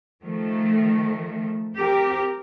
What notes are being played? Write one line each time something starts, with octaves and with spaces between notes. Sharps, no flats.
D#3 F3 A3
C4 G4 A#4